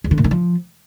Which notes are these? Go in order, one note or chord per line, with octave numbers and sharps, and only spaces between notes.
E2
D3
A#2
D#3
F3